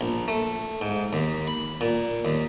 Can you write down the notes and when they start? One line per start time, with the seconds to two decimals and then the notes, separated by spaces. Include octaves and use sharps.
0.01 A#1
0.28 A3
0.81 G#2
1.13 D#2
1.47 B5
1.81 A#2
2.25 D#2